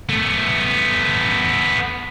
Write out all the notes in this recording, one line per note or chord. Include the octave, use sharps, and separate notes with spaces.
A3 B3